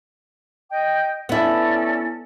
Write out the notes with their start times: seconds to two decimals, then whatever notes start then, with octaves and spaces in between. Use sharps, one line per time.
0.70 D#5 G5
1.29 B3 C#4 E4 A4 D5